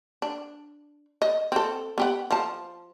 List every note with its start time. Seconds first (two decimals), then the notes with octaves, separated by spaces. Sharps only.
0.22 D4
1.22 D#5
1.52 C4 A4
1.98 B3 G4 F#5
2.31 F3 A5